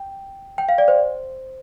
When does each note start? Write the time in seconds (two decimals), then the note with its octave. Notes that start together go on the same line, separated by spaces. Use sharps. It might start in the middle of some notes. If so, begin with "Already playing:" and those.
Already playing: G5
0.58 G5
0.69 F5
0.78 D5
0.88 C5